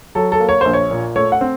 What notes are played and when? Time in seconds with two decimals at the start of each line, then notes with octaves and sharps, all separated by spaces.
0.15 F#3 A4
0.32 A4
0.40 A#3
0.49 C#5
0.61 A#1 C5
0.73 C#5
0.91 A#2
1.16 A3 C#5
1.32 F#5
1.41 C4